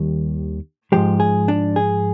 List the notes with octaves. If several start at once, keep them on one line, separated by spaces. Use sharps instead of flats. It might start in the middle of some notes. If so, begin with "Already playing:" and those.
Already playing: D#2 D#3 G3
G#2 F3 G#3 G4
G#4
D4
G#4